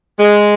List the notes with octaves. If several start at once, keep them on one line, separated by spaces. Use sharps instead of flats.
G#3